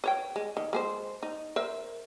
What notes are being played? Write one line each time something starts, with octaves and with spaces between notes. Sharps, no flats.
B4 C#5 G5
G#3
D#3
G#3 G#4 C5
D#4
A#4 C5 E5